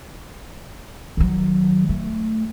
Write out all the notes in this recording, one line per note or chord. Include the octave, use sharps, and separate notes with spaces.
D#3 F#3
A3